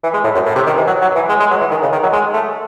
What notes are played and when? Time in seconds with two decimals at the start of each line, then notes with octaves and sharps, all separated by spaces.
0.04 E3
0.14 G#3
0.24 A2
0.35 F#2
0.46 A2
0.56 C3
0.67 D#3
0.77 E3
0.87 F#3
1.02 F#3
1.15 E3
1.29 G#3
1.40 G#3
1.51 F#3
1.61 E3
1.71 D#3
1.82 C#3
1.92 D#3
2.03 F#3
2.13 G#3
2.33 A3